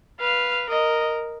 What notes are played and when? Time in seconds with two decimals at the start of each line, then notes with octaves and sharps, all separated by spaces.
0.20 B4 F5
0.69 A#4 D#5